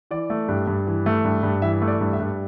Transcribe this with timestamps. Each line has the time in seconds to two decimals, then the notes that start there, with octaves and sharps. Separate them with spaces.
0.11 E3 D5
0.30 A3
0.48 G2
0.67 G2
0.87 E3
1.06 A3
1.25 G2
1.43 G2
1.62 E3 E5
1.82 A3
1.88 D5
2.01 G2
2.13 E5
2.19 G2